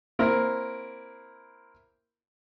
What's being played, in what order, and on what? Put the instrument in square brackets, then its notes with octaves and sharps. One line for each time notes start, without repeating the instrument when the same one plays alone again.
[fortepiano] A#3 C4 E4 A#4